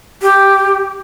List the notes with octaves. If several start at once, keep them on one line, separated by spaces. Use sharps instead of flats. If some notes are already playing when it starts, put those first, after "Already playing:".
G4